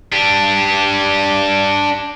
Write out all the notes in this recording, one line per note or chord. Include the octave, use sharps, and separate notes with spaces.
D4 G4